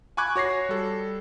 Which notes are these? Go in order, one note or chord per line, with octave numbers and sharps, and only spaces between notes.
G#5 B5 C#6 D6 F#6 G#6
F#4 C#5 A#6 C7
G3 A4